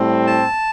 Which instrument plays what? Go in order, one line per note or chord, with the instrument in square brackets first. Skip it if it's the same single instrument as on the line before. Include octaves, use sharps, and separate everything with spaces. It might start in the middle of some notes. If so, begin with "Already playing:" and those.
Already playing: [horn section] A2 G3 C4
[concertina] A5